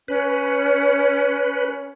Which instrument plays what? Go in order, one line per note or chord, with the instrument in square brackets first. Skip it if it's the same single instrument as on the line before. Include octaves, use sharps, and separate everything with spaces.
[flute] C#4 [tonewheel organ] B4